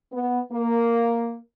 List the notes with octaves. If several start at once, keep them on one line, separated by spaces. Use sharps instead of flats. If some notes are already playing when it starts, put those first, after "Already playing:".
B3
A#3